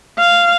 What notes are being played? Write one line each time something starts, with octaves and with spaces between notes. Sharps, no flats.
F5